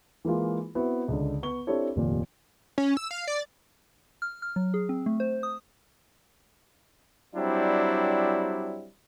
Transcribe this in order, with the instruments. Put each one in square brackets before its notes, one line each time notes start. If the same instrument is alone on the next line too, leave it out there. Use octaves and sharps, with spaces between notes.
[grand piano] E3 G#3 A#3 F4
B3 C4 E4 F#4
C#2 D3
B3 C#6 G7
C4 D4 E4 G4 A4 C#5
F1 D#2 A#2
[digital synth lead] C#4
E6
F5
D5
[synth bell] F6
F6
F#3
G#4
C4
A3
C5
D#6
[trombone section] F#3 G3 C4 D4 E4